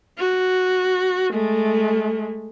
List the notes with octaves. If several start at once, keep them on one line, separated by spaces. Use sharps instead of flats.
F#4
G#3 A3